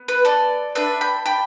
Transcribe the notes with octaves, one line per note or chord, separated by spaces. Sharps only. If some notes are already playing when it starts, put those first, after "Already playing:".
Already playing: B3
B4
A4 D5
D4 A4 B4 E5
G5 B5
G5 B5